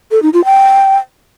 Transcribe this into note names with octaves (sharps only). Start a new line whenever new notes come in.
A4
D#4
F4
G5